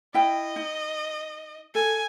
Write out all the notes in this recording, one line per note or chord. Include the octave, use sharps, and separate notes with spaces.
E4 D#5 G5
D#4
A4 G#5